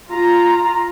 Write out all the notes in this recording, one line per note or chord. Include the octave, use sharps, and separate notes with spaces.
F4 A#5